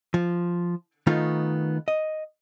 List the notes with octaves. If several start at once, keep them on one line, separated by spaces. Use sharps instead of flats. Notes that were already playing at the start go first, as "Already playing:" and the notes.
F3
D#3 A3 B3 D#4 F4
D#5